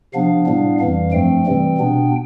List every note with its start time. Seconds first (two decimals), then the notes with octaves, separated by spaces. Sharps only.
0.13 C3 F3 B3 D4 F5
0.47 A2 G3 B3 D4
0.79 F2 E3 G3 F5
1.12 G2 F3 A3 C4 G5
1.45 C3 E3 G3 C4
1.78 B2 B3 D4